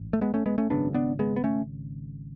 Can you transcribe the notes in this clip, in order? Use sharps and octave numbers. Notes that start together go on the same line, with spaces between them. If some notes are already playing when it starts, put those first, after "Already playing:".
Already playing: A1 G#2
A3
G#3 B3
A3 C#4
G#3 B3
A3 C#4
G#1 F#2 C#3 B3 D4
B3 D4
G#3 B3
B3
A3 C#4